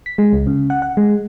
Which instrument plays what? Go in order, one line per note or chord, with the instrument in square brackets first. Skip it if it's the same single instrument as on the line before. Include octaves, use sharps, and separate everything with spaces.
[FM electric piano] B6
G#3
C#2
C#3
F#5
F#5
G#3